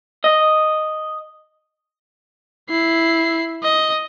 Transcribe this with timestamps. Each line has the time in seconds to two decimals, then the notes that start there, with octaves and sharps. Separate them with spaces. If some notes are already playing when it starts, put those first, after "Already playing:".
0.24 D#5
2.70 E4 C7
3.63 D#5